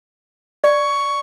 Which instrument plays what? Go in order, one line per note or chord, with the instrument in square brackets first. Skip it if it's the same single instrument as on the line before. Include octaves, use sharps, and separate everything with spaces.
[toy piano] D5 [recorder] C#6